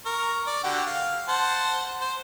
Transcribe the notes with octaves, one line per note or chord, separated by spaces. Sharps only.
A#4 C#6
D5
D3 F#4 G4
F5
C5 F#5 A5
C5